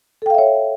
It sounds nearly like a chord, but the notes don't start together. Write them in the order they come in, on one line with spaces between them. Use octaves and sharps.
A4 G5 F5 E5 C#5